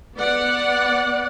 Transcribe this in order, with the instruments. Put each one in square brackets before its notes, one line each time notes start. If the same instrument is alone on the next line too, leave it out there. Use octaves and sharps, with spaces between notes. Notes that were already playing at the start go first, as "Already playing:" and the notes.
[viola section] B3 D5 F#5